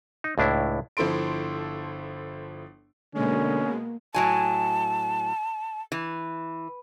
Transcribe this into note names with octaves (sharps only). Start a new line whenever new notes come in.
D#4
C#2 A2 D4 E4
G1 F3 E4 A4 C6 D7
B2 D3 G#3 A#3 C#4
A2 F#3 G#5 A5
E3